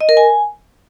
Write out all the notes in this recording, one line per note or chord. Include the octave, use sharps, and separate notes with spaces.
D#5
A#4
G#5